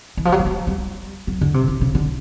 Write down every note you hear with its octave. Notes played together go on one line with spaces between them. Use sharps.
E3
F3
F#3
G3
G#3
G3
F#3
D3
C3
C3
C#3
D3